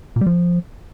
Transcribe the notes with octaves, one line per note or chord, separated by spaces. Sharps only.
A#2
G3
F3